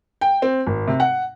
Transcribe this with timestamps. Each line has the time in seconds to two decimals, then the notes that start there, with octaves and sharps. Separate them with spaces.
0.21 G5
0.42 C4
0.67 G#1
0.87 C3
1.00 F#5